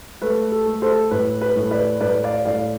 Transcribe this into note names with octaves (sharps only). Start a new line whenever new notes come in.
A3 B4
A4
A3
A4 C5
A2 B4
B4
A2
B4 D5
A2 B4 D5
D5 F5
A2 D5 F5